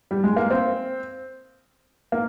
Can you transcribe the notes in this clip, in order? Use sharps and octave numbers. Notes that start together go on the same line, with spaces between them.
G3
G#3
A#3
C4
A#3